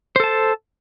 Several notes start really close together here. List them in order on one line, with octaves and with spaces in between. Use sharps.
C5 A4 A5